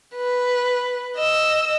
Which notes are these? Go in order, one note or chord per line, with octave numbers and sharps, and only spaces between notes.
B4
D#5 E6